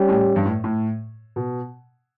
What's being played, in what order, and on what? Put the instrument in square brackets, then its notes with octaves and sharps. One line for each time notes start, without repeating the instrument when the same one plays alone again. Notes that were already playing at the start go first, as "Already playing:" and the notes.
Already playing: [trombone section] G3 C#4 G4
[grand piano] A2
G2
A2
A2
B2